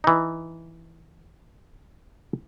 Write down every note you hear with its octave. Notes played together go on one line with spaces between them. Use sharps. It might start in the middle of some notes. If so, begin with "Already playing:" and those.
E3 D#4